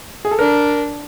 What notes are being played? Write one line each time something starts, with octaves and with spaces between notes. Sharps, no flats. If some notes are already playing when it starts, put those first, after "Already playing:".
G#4
A4
D4 A#4